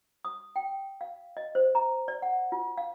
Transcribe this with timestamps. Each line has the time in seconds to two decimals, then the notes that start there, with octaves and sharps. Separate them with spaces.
0.25 D#6
0.56 G5
1.01 F5
1.37 D#5
1.55 C5
1.75 A#5
2.08 D5
2.22 F#5
2.52 F4
2.78 F5